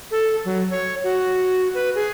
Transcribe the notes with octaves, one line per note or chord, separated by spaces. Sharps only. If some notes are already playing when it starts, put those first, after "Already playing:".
A4
F#3
C#5
F#4
B4
G#4